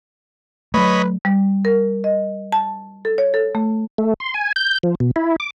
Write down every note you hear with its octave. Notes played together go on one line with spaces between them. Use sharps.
F#3 A3 B4 C#5 D#5 B5
G3
A#4
D#5
A5
A4
C#5
A4
A3
A3
C6
G#5
G6
F3
B2
E4
D6